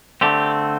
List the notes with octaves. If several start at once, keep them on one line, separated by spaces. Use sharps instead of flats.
D3 A3 C4 G4